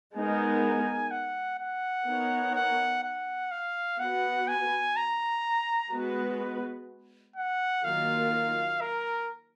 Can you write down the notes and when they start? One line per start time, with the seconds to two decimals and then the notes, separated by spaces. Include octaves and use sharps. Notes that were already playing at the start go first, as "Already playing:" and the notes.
0.14 G#3 B3 D#4 A#4 G#5
1.11 F#5
1.59 F#5
2.07 B3 D#4 A#4 C#5
2.55 F#5
3.03 F#5
3.52 F5
4.00 B3 F#4 B4 F#5
4.48 G#5
4.96 A#5
5.92 G#3 B3 F#4 B4
7.36 F#5
7.84 D#3 F#3 A#3 F4 A#4 F5
8.81 A#4